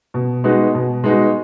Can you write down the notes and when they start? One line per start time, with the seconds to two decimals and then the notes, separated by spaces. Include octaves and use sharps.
0.14 B2
0.44 G#3 B3 D#4 F#4
0.75 B2
1.04 G#3 B3 D#4 F#4